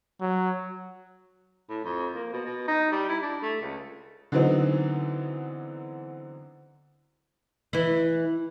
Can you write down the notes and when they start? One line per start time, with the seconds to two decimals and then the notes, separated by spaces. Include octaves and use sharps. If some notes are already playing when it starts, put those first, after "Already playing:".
0.21 F#3
1.69 A2
1.84 F2
2.15 A#3
2.33 B2
2.45 B2
2.68 D#4
2.92 G3
3.09 E4
3.23 D4
3.43 A3
3.61 C#2
4.32 D3 E3 F#3 B3 C4 D#4
7.73 E3 E4